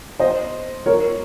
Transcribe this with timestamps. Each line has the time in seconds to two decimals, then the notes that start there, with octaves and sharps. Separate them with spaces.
0.20 C5 D#5
0.86 A#4 C#5